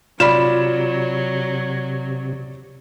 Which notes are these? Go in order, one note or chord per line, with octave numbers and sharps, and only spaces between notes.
C3 F#3 F4 D5 B5 E7